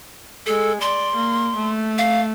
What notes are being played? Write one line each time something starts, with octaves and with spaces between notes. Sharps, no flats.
G#3 A4
D5 C6
A#3
A3
F5